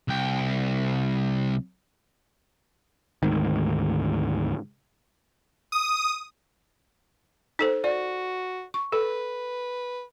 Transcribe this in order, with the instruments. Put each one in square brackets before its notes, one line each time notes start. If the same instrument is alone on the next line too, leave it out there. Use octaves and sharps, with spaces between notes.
[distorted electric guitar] C2 G5
[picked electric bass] D2 G#2 D#3
[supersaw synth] D#6
[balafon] D#4 A4 C5
[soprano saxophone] F#4 [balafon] D5
[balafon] C#6
[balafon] A4 [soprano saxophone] B4